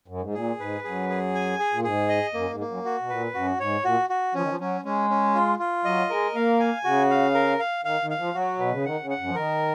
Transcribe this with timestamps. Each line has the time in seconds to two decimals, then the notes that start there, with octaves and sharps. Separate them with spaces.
0.08 F#2
0.21 G#2
0.34 A#2 G#4
0.59 G#2 B4
0.84 F#2 G#4
1.09 G#4
1.35 G#5
1.59 G#4
1.72 A#2
1.84 G#2 G#4
2.09 D#5
2.34 F#2 A#3
2.51 G#2
2.60 A#3
2.67 F#2
2.85 F#4
3.01 B2
3.09 A#2 B4
3.34 F#2 F#4
3.59 G#2 C#5
3.84 A#2 F#4
4.10 F#4
4.34 F3 C#4
4.42 D#3
4.49 F3
4.59 F#3 C#4
4.84 G#3 C#4
5.10 C#4
5.35 F4
5.59 F4
5.85 F#3 D#5
6.10 G#3 A#4
6.35 A#3 F5
6.60 G#5
6.84 C#3 F#4
7.10 F5
7.34 A#4
7.60 F5
7.85 D#3 F5
8.02 D#3
8.10 F5
8.18 F3
8.34 F#3 F#4
8.59 B2 B4
8.72 C#3
8.85 D#3 F#5
9.02 C#3
9.10 F#5
9.19 F#2
9.27 F3
9.35 D#3 A#4